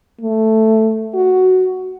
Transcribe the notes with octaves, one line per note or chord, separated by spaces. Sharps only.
A3
F#4